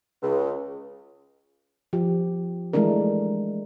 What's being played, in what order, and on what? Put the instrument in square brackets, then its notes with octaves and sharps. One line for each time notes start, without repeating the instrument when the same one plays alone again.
[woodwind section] C#2
[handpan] F3 G4
E3 G#3 A3 D4 A#4